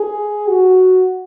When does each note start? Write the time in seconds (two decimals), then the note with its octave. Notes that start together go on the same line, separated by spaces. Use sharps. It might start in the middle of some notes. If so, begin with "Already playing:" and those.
Already playing: G#4
0.48 F#4